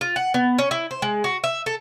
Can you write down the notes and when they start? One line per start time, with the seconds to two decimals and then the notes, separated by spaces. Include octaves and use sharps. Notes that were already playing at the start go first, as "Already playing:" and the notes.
0.01 F4
0.16 F#5
0.34 B3
0.59 C#4
0.71 E4
0.91 C5
1.02 G#3
1.24 F#4
1.44 E5
1.66 A4